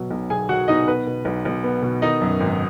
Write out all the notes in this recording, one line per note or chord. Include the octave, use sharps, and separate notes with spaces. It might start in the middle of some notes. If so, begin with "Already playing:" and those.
Already playing: B2 F#3
B1
B1 G#4 G#5
F#3 F#4 F#5
B2 D#4 D#5
B3 B4
B2
B1
B1
B3
B2
D#3 D#4 D#5
F#2
G#1